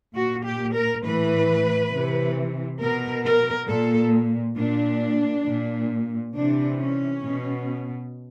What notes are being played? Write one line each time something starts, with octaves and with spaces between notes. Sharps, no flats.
A#2 F#4
G4
A#4
A2 E3 B4
C3 E3
B2 A#4
A#4
A#2 A4
A#2 D4
A#2
C3 E3 D4
C#4
B2